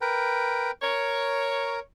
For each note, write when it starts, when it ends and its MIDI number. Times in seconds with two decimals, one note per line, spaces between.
0.01 0.71 70
0.01 0.71 71
0.01 0.71 79
0.82 1.79 70
0.82 1.79 73